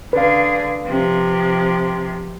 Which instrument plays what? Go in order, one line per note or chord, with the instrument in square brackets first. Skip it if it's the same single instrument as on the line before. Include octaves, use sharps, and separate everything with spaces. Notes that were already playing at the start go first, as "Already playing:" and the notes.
[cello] D3 G#4 [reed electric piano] B4 F5
[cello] C3 F3